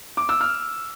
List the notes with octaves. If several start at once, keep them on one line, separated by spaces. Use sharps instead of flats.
D6
E6
F6